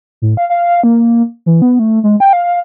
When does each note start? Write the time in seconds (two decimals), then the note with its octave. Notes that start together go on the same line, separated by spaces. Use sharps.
0.22 A2
0.37 F5
0.50 F5
0.84 A#3
1.46 E3
1.62 B3
1.79 A3
2.04 G#3
2.20 G5
2.33 F5